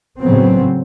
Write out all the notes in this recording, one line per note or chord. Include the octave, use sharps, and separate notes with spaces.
A2 C#3 F#3 B3 C4